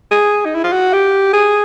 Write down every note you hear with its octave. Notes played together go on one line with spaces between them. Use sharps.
G#4
D#4
E4
F4
F#4
G4
G#4